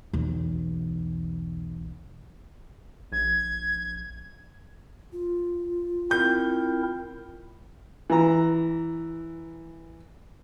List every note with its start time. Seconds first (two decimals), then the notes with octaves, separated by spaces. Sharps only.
0.13 B1 E2
3.12 A#1 G#6
5.13 F4
6.11 C4 E4 A#4 G6
8.10 E3 A#5